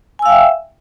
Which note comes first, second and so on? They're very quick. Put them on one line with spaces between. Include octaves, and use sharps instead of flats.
G#5 E6 F5 G5 E5